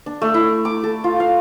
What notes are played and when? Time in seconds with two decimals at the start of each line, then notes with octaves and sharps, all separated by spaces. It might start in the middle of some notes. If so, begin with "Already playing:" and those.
0.06 D4
0.22 A3
0.34 E4
0.65 D6
0.84 A4
1.04 F4
1.20 F5